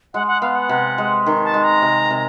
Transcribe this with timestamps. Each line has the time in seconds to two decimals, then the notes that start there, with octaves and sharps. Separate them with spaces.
0.14 G#3 F#5
0.27 F#5
0.42 B3 F5
0.55 F#5
0.69 C3
0.98 G#3
1.26 D#3
1.44 A5
1.54 G#3
1.64 A#5
1.82 C3
2.11 C3